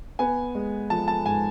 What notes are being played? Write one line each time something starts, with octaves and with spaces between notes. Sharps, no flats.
B3 G#5
G#3
F3 A5
A5
G#2 G#5